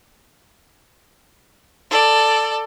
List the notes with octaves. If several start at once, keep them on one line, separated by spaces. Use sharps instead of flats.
A4 D5